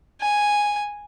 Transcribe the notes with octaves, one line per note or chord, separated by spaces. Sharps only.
G#5